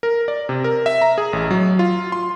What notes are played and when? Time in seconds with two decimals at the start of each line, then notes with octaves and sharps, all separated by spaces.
0.03 A#4
0.28 D5
0.49 C3
0.64 A#4
0.86 E5
1.02 A#5
1.18 G#4
1.33 A1
1.51 F#3
1.79 F4
2.12 C6